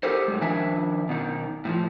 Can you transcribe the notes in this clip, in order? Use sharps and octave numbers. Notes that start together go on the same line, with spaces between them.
D#4 F#4 G4 A4 A#4 C5
A2 F#3 G#3
D#3 F3 D4 E5 G#5
B2 D#3
A2 E3 F3